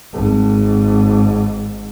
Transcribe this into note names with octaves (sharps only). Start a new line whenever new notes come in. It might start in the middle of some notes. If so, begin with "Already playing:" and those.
G#1 G#2